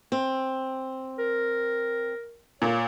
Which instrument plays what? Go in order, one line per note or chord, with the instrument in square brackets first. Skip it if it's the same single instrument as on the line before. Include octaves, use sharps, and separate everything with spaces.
[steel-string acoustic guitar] C4
[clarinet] A#4
[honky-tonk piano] A#2 [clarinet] C#5